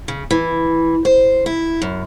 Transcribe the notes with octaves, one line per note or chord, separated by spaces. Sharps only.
C#3
E3
C5
E4
F#2